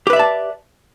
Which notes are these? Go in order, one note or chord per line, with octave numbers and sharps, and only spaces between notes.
G4 B4 D5 E5 A5